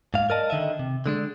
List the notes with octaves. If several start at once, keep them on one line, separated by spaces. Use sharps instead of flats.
G#2 F5
A#4 D5 D#5 A5
D3 D#3 D#5 E5
C3
D3 G#3 D4